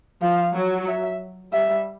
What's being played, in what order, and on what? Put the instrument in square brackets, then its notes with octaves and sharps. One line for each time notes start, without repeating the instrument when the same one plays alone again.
[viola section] F3 [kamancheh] F5
[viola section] F#3
[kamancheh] E5
[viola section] G3 [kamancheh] E5